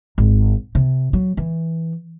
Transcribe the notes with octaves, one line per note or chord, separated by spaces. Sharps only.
G#1
C3
F#3
E3